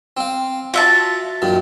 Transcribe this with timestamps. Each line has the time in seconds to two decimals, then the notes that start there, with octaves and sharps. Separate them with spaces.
0.17 C4 F5
0.74 F4 F#4 E5 A5
1.42 F#2 A#2 D#3